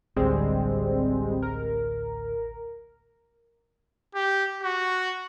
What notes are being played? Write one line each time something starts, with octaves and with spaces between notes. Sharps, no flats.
A1 D2 G3 G#3 C4
A#4
G4
F#4